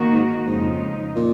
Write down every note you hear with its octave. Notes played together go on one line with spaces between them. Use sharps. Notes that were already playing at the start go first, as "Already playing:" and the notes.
Already playing: D#3 A#3 D#4 F#4
G#2
F2 G#2 C#3 F3 G#3 D#4
A#2